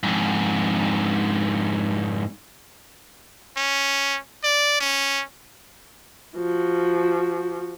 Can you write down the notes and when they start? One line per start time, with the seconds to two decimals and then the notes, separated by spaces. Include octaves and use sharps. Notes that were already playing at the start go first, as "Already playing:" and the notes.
0.03 F2 G#2
3.57 C#4
4.44 D5
4.80 C#4
6.36 F3 F#4